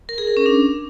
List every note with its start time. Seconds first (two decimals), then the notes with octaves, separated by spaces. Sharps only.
0.09 A#4
0.18 G#4
0.27 A#4
0.37 C#4
0.46 D4